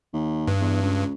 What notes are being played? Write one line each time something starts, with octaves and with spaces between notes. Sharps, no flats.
D#2
G2
E2
C#2